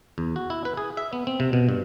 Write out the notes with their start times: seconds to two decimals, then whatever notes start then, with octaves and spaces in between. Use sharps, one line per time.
0.18 E2
0.36 F#4
0.50 E4
0.65 B4
0.77 G#4
0.97 E5
1.13 B3
1.27 C4
1.40 C3
1.53 B2
1.69 G2